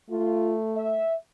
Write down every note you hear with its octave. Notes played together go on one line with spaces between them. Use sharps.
A3 F4
E5